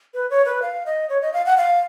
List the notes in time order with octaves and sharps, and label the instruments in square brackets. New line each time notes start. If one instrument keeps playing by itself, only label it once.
[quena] B4
C#5
B4
F5
D#5
C#5
D#5
F5
F#5
F5